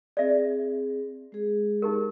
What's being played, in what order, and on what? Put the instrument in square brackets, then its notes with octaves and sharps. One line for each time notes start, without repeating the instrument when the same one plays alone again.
[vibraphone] C4 G#4 [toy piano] D5 E5
[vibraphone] G#3 G#4
[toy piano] D#4 G4 A#4